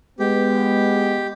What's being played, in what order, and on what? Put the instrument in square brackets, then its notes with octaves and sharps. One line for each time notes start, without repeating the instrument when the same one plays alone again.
[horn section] G#3 B3 [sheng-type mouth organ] G4